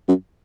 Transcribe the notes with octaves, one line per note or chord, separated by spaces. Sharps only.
F#2